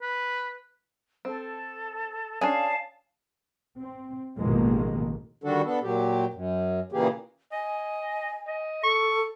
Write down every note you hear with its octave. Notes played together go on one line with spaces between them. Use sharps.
B4
C4 A4
C#4 D4 G#4 F5 G#5 A5
C4
A1 F2 B2 D#3 G#3 A#3
D3 D#3 G3 D4 F#4 A4
B3 D4 A4
A#2 F#3 G4
F#2
A#2 C#3 E3 A#3 G4 G#4
D#5 G#5
D#5
A4 C#6